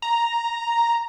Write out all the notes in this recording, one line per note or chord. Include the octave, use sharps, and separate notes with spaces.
A#5